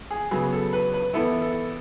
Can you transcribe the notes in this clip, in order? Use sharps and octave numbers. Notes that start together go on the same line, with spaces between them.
G#4
C#3 F#3 B3 G#4
A4
B4
B4
E3 B3 E4 A4
A4